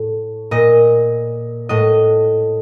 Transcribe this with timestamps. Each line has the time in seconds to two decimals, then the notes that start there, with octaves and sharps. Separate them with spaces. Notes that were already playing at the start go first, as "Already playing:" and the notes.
Already playing: A2
0.51 A#2 D#5
1.69 A2 D#5